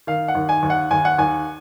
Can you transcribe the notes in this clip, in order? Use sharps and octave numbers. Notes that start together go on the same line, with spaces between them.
D#3 F5
F#5
D#2
G#5
D#2
F#5
D#2 G#5
F#5
D#2 G#5